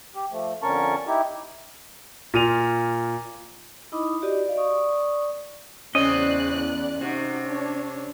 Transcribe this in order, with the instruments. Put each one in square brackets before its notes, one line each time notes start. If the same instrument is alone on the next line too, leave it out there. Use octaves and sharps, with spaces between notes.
[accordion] G4
F3 A3
F2 D3 C#4 A#4 A5 C#6
D#4 E4 G4
[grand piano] A#2 F4 D#7 F7
[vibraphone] D#4 E4 D#5 B5 D6 D#6
F#4 G4 D5 D#5
D5 F5
D5 C#6 D#6
[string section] E2 D5 F#6 [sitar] C#3 C4 [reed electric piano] C#4 [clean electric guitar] D#5
[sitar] C3 [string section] D#4 F#4
[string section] D4 C#5